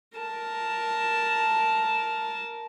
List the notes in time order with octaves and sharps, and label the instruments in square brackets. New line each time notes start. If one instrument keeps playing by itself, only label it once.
[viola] A#4 A5